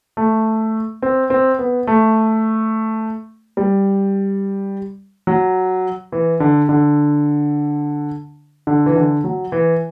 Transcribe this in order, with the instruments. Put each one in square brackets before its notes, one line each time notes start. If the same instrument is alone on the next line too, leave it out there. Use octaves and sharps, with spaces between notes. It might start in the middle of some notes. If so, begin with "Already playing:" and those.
[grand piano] A3
C4
C4
B3
A3
G3
F#3
E3
D3
D3
D3
E3
D3
F#3
E3